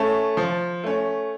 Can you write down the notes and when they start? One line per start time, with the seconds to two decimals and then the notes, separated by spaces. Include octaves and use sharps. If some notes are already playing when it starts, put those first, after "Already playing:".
Already playing: A3 C#4 A5
0.37 F3
0.84 A3 C#4